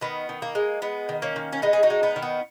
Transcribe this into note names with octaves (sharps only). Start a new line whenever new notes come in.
D#3 B3
D#3
A#3
G#3
G#3 B3
D#3
A#3 C#4
D#3
C#4
G#3 B3 D#4
G#4
D#4 F#4
G#3
B3 D#4
D#3
B3